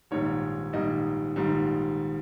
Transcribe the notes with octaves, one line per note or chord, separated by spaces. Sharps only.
A#1 G#2 D#3 G3 C#5
A#1 G#2 D#3 G3 D#5
A#1 G#2 D#3 G3